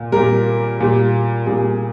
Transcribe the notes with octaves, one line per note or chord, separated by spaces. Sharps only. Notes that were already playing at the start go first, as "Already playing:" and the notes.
Already playing: A#2
A#2 G3 A#4
A#2 G3
A#2 G3 G#4